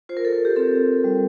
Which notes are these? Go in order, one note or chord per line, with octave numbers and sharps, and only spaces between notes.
F4 C5
A#4
A4
A#4
G4
C4 A4
G3